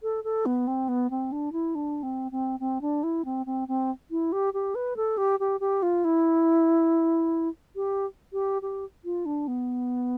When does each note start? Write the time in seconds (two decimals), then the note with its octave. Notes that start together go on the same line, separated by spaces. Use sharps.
0.03 A4
0.24 A4
0.46 B3
0.67 C4
0.88 B3
1.10 C4
1.32 D4
1.52 E4
1.75 D4
2.03 C4
2.32 C4
2.60 C4
2.81 D4
3.03 E4
3.25 C4
3.46 C4
3.68 C4
4.11 E4
4.32 G4
4.54 G4
4.75 B4
4.97 A4
5.17 G4
5.40 G4
5.60 G4
5.83 F4
6.04 E4
7.76 G4
8.33 G4
8.62 G4
9.05 F4
9.26 D4
9.48 B3